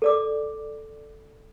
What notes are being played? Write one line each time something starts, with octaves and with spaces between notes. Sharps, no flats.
A4 D5 D6